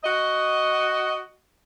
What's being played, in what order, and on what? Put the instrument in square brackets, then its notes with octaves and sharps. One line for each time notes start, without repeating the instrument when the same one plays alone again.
[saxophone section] F#4 D#5